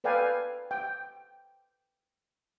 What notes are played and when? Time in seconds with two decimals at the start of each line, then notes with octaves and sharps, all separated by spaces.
0.04 A4 B4 D5 F5 G5 G#5
0.71 G5